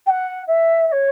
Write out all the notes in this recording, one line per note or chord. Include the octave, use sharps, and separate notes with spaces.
G5
F#5
E5
E5
C#5